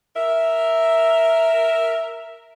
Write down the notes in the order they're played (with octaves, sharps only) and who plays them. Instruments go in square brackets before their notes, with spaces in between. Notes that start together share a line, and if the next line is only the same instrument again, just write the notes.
[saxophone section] A#4 E5